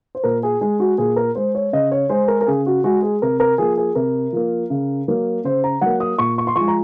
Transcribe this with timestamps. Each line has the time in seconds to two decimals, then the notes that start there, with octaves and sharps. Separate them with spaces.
0.15 C5
0.24 A#2 A#4
0.43 G#4
0.61 G#3 G#4
0.80 F#4
0.98 A#2 G#4
1.16 A#4
1.35 G#3 C5
1.55 C#5
1.73 C#3 D#5
1.92 C#5
2.09 G#3 C5
2.28 A#4
2.41 A#4
2.47 C#3 G#4
2.66 F#4
2.84 G#3 F#4
3.02 G#4
3.22 C3 A#4
3.40 A#4
3.58 F3 A#3 G#4
3.78 G#4
3.95 C3 A#4
4.33 F3 A#3
4.70 C#3
5.08 F#3 A#3
5.44 C#3 C5
5.64 A#5
5.81 F#3 A#3 F#5
6.00 D#6
6.18 A#2 C#6
6.38 C#6
6.47 C6
6.56 F3 G#3 C#6
6.68 A#5